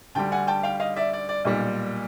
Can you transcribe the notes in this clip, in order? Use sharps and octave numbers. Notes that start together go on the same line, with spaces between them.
D2 D3 G3 G5 A5
F#5 G#5
G5 A5
F5 G5
D#5 F5
D5 E5
D5
D5
B1 A#2 G3